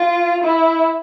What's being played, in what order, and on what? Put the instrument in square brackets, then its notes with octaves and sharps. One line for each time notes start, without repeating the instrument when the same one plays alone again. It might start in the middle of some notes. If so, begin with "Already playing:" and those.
Already playing: [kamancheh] F4
E4